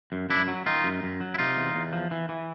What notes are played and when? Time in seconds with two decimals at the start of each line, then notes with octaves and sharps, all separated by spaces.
0.12 F#2
0.30 F#2 D4 E4
0.48 F#3
0.66 D#3 D#4 F4
0.84 F#2
1.03 F#2
1.21 F#3
1.34 E4
1.38 C3 D#4 F4
1.57 E2
1.75 E2
1.93 F3
2.11 E3
2.29 E3